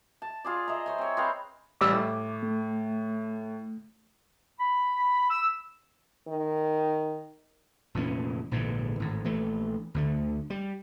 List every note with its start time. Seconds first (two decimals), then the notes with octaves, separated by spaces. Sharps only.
0.22 A5
0.44 F4 G#4 D5
0.68 D#5 E5 A#5
0.86 C5 C#5 G#5
0.98 C4 C#5
1.17 C4 G#4 B4 F5
1.81 A1 G3 D6 E6
1.93 A2
2.43 A3
4.59 B5
5.30 E6
6.28 D#3
7.95 F1 A#2 E3 C#4
8.51 A#1 G#2 D3 E3
9.00 G#1 A2
9.24 A#1 E3 A3
9.94 D2 D3 A3
10.50 G3